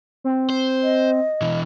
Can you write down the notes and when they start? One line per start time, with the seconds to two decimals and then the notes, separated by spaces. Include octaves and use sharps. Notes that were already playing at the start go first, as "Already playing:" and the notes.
0.24 C4
0.50 C5
0.83 D#5
1.41 B2 E3